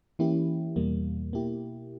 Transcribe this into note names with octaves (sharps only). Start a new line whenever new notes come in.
E3 A#3 C#4 E4 G4
E2 B2 G3 A#3
B2 A#3 E4 G4